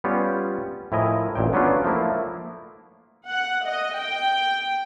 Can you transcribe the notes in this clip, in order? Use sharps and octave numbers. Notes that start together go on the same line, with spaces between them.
G3 B3 C#4 F4 G4
A2 F3 E4 A#4 D#5 G#5
A1 A#2 G5
F#3 B3 C#4 D4 F4
F3 A3 A#3 E4
F#5
D#5
G5